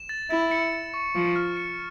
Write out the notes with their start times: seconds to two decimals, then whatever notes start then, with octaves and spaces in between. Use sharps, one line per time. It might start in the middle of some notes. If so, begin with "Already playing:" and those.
Already playing: E7
0.09 A6
0.30 E4 A6
0.51 C#7
0.73 A6
0.94 C#6
1.15 F3 C#6
1.36 F6
1.57 C#7